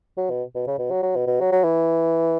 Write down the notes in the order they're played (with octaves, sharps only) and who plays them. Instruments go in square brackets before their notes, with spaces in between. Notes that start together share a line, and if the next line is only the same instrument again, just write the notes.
[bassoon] F#3
B2
B2
C#3
B2
F#3
F#3
B2
B2
F#3
F#3
E3